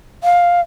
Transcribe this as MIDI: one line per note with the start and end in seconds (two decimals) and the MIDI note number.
0.24 0.60 77